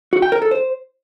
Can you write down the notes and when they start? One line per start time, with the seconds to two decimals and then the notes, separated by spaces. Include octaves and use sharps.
0.13 F#4
0.22 G5
0.32 A#4
0.42 A4
0.51 C5